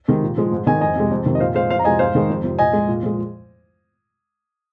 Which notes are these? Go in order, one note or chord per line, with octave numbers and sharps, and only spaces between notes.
C3 D#3 G#3
A#2
F3 G#3
G#2
D#3 G#3 D#5 G#5
F2 D#5 G#5
C3 G#3
F2
C3 D#3
D#5
A#2 C5 F5
G#3 C5 F5
F2 C5 F5
A#5
C3 F3 G#3 D#5 G#5
G#2 C5 F5
D#3 G#3
F2
C3 F3
A#2 D#5 G#5
G#3
A#2
F3 G#3